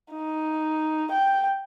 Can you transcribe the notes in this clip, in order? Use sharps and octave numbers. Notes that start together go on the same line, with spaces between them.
D#4
G5